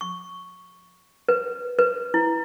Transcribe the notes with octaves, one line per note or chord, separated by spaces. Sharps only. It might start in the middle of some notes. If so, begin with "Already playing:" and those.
C#6
B4
B4
E4